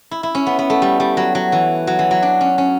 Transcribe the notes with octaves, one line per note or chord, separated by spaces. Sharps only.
E4
E4
C#4
B3
B3
A3
G3
G3
F#3
F#3
E3
F#3
E3
F#3
D4
C#4
C#4